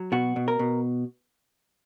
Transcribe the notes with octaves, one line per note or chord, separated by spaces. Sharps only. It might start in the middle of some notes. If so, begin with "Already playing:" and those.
Already playing: F#3
B2 F#4
B2
A#4
B2